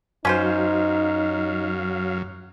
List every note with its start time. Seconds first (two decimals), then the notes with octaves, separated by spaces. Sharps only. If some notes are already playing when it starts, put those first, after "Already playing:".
0.25 F#2 F#3 C#4 D#4 F4 C5 F5